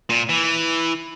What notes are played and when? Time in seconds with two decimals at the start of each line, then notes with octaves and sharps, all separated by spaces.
0.10 A#2
0.29 E3